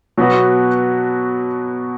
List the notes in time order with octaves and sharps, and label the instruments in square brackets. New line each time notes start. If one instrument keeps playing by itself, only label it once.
[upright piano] B2 [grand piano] F#3 B3 F#4